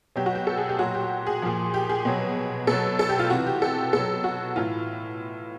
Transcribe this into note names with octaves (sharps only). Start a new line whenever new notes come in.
B2 F#3 G4
F#4
G4
A4
G#4
G4
A#2 F#3 F#4
G4
G#4
A#2 F3
G4
G#4
B2 F#3
B2 F#3 A4
A4
G4
F4
C3 E3 F#4
G4
A4
B2 F#3 A4
F#4
A2 E3 F4